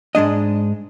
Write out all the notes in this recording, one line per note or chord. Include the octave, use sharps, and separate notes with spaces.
G#2 G#3 D4 D#5